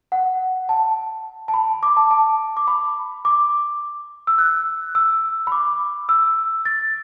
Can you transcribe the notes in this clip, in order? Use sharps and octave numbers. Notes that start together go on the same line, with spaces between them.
F#5
A5
A5
B5
D6
A5
A5
D6
B5
D6
E6
F#6
E6
B5
D6
E6
A6